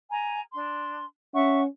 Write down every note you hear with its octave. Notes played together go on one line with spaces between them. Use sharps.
G#5 A#5
D4 C6
C#4 E5 F#5 C#6